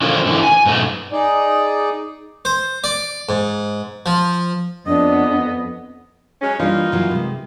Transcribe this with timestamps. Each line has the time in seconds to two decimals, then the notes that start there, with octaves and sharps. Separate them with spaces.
0.02 D3 D#3 F3 F#3 C4 C#4
0.25 G#2 D3 E3 F#4
0.43 G#5
0.66 G#2 B2 F#3 A3
1.12 D#4 G#4 D5
2.45 C5
2.84 D5
3.29 G#2
4.06 F3
4.87 F2 B3 D4 D#5
6.42 F#3 G#3 C#4
6.60 E3 G3 A#3 D4 D#4 F4
6.92 C#3 E3 F#3
7.11 C3 G#3